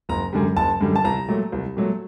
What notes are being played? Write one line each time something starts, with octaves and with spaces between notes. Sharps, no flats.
F#1 A#5
F#2 D3 G3
F#1 A5
F#2 D3 G3
A5
C2 A#5
A#2 F#3 A3
C2
A#2 F#3 A3